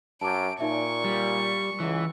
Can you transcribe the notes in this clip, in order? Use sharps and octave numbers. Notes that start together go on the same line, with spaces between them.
F#2 A5 D6 D7
A#2 D#4 D5 E5 C#6
G3
C#2 E3